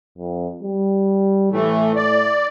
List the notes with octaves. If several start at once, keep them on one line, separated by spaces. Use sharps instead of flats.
F2
G3
A2 E3 A3
D5